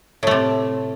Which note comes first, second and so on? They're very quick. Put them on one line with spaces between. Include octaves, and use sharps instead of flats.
A2 A3 C3